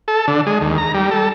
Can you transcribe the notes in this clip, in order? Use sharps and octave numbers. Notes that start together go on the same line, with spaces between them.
A4
D3
G#3
D#2
A#5
G3
A4